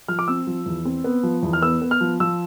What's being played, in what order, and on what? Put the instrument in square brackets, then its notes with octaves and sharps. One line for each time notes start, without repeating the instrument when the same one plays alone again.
[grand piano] F3 F6
D6
C4 E6
F3
E2
C4
B3
F3
E2
F6
B3 E6
B3
F6
F3
F3 E6